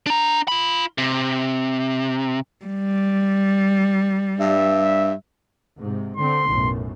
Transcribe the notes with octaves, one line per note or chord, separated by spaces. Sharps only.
D4 A#5
F4 B5
C3
G3
G2 E5
G#2 C3
D3 C4 C6
B1 F#2 A2